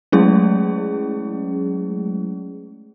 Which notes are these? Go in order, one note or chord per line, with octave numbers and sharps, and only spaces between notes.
F#3 G#3 A3 C#4 E4 G#4